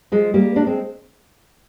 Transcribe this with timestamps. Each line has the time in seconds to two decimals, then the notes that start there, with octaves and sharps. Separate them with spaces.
0.12 F3 G#3
0.34 G3 A#3
0.56 A#3 D4
0.67 G#3 C4